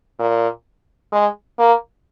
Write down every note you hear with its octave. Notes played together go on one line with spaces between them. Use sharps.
A#2
G#3
A#3